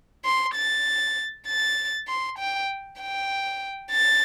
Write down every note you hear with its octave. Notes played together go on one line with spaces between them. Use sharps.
C6
A6
A6
C6
G5
G5
A6